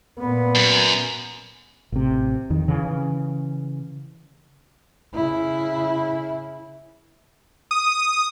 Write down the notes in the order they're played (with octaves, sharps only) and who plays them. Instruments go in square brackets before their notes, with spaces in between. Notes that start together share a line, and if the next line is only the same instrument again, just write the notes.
[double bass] A#2 B3
[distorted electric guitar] F#2
[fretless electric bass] A1 C3
F2 D#3
C#3 E3
[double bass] C#3 E4
[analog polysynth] D#6